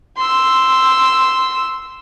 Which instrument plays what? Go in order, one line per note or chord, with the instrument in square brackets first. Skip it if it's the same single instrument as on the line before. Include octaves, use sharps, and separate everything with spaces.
[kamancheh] C6 E6